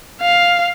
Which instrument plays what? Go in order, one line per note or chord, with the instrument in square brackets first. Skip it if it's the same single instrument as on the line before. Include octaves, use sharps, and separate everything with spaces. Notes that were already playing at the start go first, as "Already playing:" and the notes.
[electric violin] F5